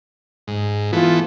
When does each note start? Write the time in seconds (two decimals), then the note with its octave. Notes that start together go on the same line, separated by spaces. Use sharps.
0.48 G#2
0.93 E3 A3 B3 F4